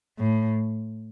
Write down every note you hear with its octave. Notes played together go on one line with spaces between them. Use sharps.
A2